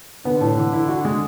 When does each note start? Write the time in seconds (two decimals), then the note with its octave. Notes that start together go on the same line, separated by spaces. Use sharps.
0.25 D3 B3
0.41 A2
0.57 E3
0.73 E4
0.89 F#4
1.05 G#3